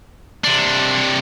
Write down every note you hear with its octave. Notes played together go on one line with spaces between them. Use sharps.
C3 D4